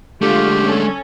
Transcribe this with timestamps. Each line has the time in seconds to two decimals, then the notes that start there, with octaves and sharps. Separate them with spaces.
0.22 D3 G#3 A3 F4 G4
0.63 C#4 A4